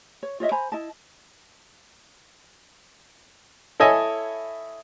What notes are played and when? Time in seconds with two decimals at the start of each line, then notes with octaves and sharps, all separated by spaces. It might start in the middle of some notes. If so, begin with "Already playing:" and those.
0.23 C#5
0.40 F4 C#5 D#5 E5
0.52 C5 G#5 A#5 B5
0.72 E4 D#5 A5
3.80 E4 A4 C#5 D#5 E5 G#5